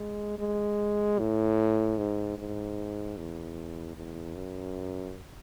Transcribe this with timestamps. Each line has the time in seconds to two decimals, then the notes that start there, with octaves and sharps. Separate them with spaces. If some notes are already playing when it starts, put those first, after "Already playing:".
Already playing: G#3
0.39 G#3
1.19 A2
1.98 G#2
2.38 G#2
3.17 E2
3.96 E2
4.35 F#2